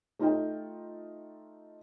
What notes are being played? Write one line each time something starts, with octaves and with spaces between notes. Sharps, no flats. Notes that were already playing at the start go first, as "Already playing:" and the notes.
A3 D#4 F4 G4 D#5 G5